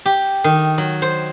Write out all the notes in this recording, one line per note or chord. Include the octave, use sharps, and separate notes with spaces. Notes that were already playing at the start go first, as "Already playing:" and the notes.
G4
D#3
F#3
C5